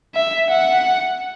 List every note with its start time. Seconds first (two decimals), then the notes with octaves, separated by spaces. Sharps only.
0.15 E5
0.50 F#5